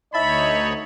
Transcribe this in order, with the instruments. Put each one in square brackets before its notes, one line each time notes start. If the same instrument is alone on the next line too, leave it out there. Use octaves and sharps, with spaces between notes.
[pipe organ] D2 D#4 C#5 [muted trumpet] D#5 [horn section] E5 A5 B5